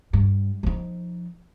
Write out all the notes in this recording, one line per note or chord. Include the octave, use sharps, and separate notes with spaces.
G2
F3 D#4